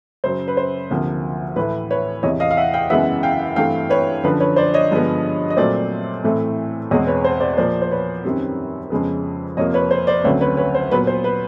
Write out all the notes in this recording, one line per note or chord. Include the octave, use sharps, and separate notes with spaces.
F#2 C#3 F#3 C5
B4
C5
D2 C3 F3 A#3
A2 E3 A3 B4
B4 C#5
E2 C3 E3 C#5 D#5
D#5 F5
F5
E5 F#5
F5 G5
F#2 C#3 E3 G#3 B3 E5 F#5
F5 G5
G2 E3 A3 C4 F5 G5
B4 C#5
F#2 D3 F3 B4
B4 C#5
C5 D5
C#5 D#5
G2 D3 F3 G#3 B3
D#5
A#2 F#3 A3 C4 C5 D5
A2 E3 A3 C4
E2 B2 G#3 C4 C#5 D#5
B4 C#5
C5
C5 D5
A#2 F3 A#3 C5 D5
C5
B4 C#5
F#2 D#3 G3 C4
F2 C#3 F3 G#3 B3
F2 C3 F3 A#3 C#5 D#5
B4 C#5
C5
C5 D5
D2 C#3 F#3 A3 C4 B4 C#5
B4 C#5
B4 C#5
C5
A#2 F#3 B3 B4
C5
B4